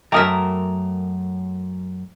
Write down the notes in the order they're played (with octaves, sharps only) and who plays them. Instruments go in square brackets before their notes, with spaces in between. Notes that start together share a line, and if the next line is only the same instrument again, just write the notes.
[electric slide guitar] F#2 A#5 [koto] A3 A#4 E5 [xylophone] G5 D6 D#6